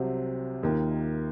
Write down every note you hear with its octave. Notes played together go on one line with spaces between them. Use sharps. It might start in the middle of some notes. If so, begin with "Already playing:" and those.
Already playing: C2 C3 F#3 C4 F#4
D#2 D#3 A#3 F4